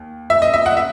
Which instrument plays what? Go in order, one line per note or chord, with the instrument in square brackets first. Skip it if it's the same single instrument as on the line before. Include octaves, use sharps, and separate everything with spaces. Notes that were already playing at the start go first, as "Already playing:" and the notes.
Already playing: [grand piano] D#2
E5
D#5
E5
F#5
E5